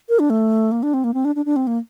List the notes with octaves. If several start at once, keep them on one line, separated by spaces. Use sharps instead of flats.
A#4
D4
A3
A#3
D4
C4
A#3
C4
D4
D4
D4
C4
A#3